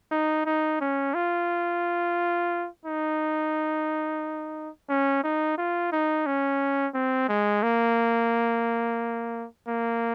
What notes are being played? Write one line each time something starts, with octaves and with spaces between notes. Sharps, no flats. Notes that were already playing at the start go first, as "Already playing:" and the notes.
D#4
D#4
C#4
F4
D#4
C#4
D#4
F4
D#4
C#4
C4
G#3
A#3
A#3